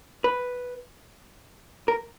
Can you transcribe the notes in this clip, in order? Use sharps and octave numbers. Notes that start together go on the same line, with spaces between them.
B4
A#4